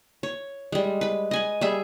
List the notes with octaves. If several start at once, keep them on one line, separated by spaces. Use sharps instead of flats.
C#5
G3 G#3
B4 B5
D#5 G#5 B5
G3 G#4 E5 B5